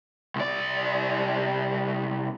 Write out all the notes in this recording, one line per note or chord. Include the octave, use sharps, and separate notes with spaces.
C2 D5